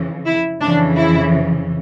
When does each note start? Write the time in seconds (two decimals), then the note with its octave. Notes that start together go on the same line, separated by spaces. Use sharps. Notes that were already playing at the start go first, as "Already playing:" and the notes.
Already playing: F2 C#3 E3
0.25 E4
0.61 F2 C#3 E3 D4
0.97 E4